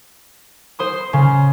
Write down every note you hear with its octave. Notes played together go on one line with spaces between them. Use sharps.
C5 C6 D#6
C#3